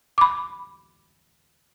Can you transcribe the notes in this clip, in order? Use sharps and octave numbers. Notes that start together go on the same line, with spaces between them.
B5 D6